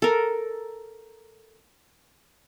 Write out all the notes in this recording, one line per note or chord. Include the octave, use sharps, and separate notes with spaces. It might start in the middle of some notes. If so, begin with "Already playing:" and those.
A4 A#4